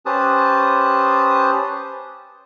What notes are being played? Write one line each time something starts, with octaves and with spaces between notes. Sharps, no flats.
C#4 G4 B4 C5 A5 D#6